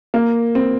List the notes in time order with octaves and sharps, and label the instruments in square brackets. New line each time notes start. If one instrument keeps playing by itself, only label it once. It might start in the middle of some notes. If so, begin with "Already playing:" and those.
[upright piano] A#3
C4